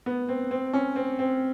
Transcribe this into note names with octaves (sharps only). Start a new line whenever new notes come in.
B3
C4
C4
C#4
C4
C4